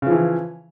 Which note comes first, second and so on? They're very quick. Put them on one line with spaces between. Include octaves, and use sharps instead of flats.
C#3 F3 E3